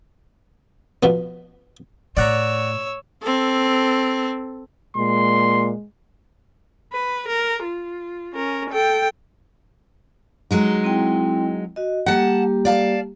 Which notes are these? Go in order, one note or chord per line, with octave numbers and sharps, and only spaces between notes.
B2 F3 B3
A2 C#5 D5 F#5 A#5 E6
C4 A4
A#2 G#3 C6
B4
A#4
F4
C#4 A#4
A4 G5
F#3 G#3 D#4
C4 E4 G5
F#4 D#5
G3 A#3 G4 F#5 A5
D5 F5 A5